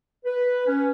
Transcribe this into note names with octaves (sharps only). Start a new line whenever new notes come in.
B4
C#4